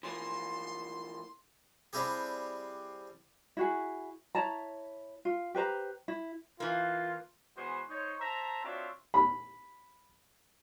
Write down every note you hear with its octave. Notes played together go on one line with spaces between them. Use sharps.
E3 F3 A#3 C6
G3 C4 D4 E4 G4 G#4
E4 F#4 G#4
E4 C#5 A5 A#5
F4
G4 B4 C5 A#5
E4
E3 A#3 F4
E3 G#3 B3 F#4 C5
D#4 C5 C#5
C5 E5 A5 A#5
C4 D4 F4 F#4 C#5 E5
B5